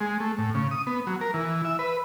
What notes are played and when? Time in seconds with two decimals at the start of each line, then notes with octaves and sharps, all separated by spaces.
0.01 G#3
0.20 A3
0.38 A2
0.54 C#3
0.71 D#6
0.87 B3
1.07 F#3
1.21 A#4
1.34 E3
1.65 E5
1.79 B4